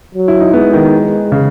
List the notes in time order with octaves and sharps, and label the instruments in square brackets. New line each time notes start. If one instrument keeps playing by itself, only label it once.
[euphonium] F#3
[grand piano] E4
D#4
[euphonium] G#3 [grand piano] B3
[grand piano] D#3
C#3